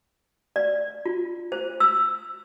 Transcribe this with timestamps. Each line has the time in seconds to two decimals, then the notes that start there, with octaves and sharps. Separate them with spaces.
0.56 D5
1.06 F4
1.52 C5
1.80 E6